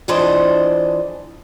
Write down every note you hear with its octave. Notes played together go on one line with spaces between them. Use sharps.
F2 E3 D4 C5 D#5